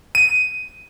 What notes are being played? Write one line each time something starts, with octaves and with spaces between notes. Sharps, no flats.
D#7